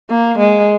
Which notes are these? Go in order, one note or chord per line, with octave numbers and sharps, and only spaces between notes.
A#3
G#3